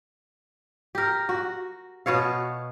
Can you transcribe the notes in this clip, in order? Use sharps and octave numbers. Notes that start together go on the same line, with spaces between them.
G4 A#4
F#4
B2 B3 C#5 F5